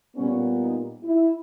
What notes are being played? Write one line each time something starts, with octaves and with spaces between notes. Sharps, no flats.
A#2 G3 B3 C#4
D#4
E4